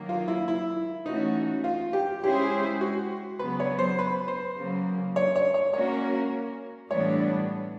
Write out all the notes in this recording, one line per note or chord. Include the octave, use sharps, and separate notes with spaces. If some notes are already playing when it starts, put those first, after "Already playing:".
Already playing: D#3 F#3 A#3
F4
E4
E4
E3 A3 C#4 D#4 F#4
F4
G4
G#3 C#4 E4 G4 G#4 C5
F#4
C#3 F#3 B3 B4
C#5
C5
B4
C5
C#3 F#3 A#3
C#5
C#5
C#5
A#3 C#4 F#4 A#4 C#5
A2 E3 G3 B3 D4 C#5